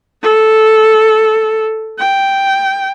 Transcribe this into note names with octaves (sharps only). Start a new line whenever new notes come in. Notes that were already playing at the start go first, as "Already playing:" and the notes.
A4
G5